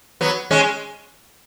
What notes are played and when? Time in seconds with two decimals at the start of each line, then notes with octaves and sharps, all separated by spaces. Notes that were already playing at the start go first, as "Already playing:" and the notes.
0.21 F#3 B3
0.51 G#3 C#4